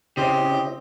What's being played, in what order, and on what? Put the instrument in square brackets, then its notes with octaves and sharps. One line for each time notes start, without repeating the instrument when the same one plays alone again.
[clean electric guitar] C#3 [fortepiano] C4 C5 [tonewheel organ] C#4 E4 D#5 [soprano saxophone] G4